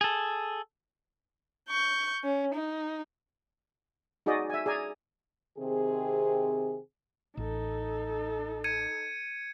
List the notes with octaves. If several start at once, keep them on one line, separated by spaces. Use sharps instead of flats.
G#4 A4
C#6 G6
C#4
D#4
D#4 F#4 G#4 D5 D#5
E5 G#5
G#4 D5 G#5 A#5
C3 D#3 C4 G#4
A1 D#4 A4
G#6 C#7 D#7